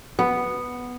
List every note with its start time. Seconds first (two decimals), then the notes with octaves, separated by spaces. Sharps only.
0.19 B3